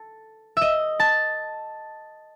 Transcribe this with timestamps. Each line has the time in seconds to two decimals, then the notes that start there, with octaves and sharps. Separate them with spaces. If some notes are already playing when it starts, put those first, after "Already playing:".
Already playing: A4
0.57 D#5 E5
1.00 A5